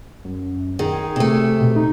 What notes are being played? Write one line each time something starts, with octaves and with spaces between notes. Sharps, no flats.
F#2
D#3 G#4
C3 A3
B2
D#4